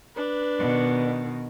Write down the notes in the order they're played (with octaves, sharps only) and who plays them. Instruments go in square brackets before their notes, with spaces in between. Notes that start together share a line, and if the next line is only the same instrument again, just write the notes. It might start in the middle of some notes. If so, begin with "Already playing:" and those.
[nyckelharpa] D4 B4
[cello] B2 D#3